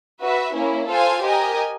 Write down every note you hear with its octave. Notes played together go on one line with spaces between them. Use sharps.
F#4 B4 E5
A#3 C#4 E4
F4 A4 C5 F5 G#5
G4 A#4 D#5 G#5